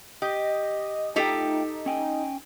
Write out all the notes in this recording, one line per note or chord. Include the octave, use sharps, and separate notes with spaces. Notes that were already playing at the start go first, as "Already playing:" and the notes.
G4 D#5
A3 D#4 F4 G4 A4 D#5 G5
C#4 G5 G#5